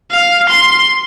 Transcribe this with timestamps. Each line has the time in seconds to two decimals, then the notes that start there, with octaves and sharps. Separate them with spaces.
0.11 F5
0.49 C6